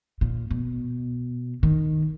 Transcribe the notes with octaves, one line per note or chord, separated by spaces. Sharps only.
A#2
B2
D#3